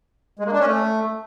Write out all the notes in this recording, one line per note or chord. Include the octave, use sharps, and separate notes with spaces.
G#3
A#3
D4
C#4
A3